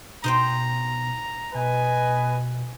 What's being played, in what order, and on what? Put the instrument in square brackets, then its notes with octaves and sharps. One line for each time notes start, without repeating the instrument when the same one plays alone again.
[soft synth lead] B2 [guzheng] D#4 C5 G5 [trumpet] A#5
[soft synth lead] B2 [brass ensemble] B4 D#5 G#5